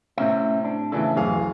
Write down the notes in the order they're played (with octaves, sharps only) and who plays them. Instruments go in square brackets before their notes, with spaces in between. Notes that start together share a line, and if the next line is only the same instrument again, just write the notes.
[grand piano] A2 C3 [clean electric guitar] C4 C#4 E5
[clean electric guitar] D4
[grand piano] A2 C#3 E3 [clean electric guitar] B3 D4 A4
[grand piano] D1 G#4 F5 [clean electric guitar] F#2 E3